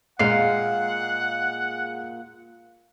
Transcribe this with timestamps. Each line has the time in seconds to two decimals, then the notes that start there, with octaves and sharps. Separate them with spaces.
0.19 A#2 G#3 F5 F#5 C7